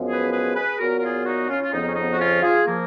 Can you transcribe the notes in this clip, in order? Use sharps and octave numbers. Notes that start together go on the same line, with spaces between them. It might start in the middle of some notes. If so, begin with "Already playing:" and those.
Already playing: F#2 F3 G#3 B3
G#4 B4
G#4 B4
G#4 B4
A#2 F#3 B3 F#4 A#4
A#4
F4 G#4
D#4 F#4
C#4 F4
F4
F2 C#3 F3 B3 D#4
C#4
B3 D#4
F#4
C#4 F4
F4 G#4
F3 A#3